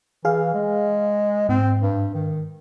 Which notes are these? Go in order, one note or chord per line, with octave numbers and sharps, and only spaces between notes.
E3 G#4 F5
G#3
G#2 C4
G2
D#3